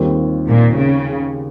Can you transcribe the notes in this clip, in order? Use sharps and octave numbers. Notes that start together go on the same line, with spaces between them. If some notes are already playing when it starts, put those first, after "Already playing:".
Already playing: D#2 D#3 G3 C4 F4
A#2
C#3